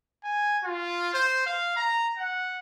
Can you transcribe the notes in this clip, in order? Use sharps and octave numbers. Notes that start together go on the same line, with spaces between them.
G#5
F4
C5
F5
A#5
F#5